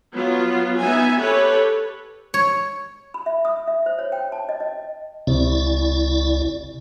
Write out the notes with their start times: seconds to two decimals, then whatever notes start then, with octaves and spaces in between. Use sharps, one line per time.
0.14 F#3 B3 F4
0.80 B3 D#4 E5 G#5
1.18 G4 A4 B4 C#5
2.34 C#5
3.14 B5
3.26 E5
3.45 D#6
3.67 E5
3.86 C5
3.99 C#5
4.12 G5
4.32 A5
4.49 D#5
4.60 D#5
5.27 C#2 C3 E4 D5